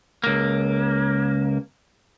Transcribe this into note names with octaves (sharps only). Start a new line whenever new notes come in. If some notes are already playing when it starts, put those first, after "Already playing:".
C#2 A#3